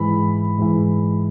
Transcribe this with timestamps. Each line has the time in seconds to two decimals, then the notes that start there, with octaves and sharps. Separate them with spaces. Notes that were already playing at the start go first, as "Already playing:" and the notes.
Already playing: G#2 E3 B5
0.58 G#2 E3